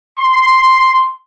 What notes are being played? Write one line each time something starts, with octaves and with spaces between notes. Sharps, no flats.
C6